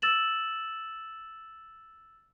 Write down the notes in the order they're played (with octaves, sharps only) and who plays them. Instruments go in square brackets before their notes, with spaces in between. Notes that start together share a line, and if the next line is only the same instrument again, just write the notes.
[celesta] E6 A6 E7 F#7